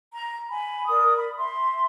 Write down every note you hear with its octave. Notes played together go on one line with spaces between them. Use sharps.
A#5
G#5 B5
A#4 D5 D#6
B5
E5 C6